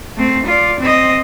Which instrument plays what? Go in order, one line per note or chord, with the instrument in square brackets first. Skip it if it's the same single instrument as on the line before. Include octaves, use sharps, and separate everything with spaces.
[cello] A3 C4
F4 D5
C4 D#5